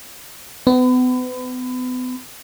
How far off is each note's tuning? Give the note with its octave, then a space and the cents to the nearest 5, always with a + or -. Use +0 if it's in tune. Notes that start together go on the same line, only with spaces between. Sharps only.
B3 +35